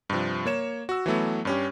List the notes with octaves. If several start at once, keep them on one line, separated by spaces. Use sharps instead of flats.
G2 C3 F3
A#3 C#5 E7
F#4 E6
E3 F#3 A3 B3
G2 C#4 G4